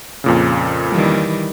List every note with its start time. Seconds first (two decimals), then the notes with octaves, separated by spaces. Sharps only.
0.24 F2 A#2 C#3
0.90 D#3 E3 G3